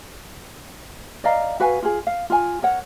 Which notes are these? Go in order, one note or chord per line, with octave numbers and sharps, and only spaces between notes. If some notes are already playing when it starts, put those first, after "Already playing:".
D5 D#5 F5 A#5
F#4 B4 F5 G#5
F4 G#4
F5
F4 G#5
A#4 C#5 F#5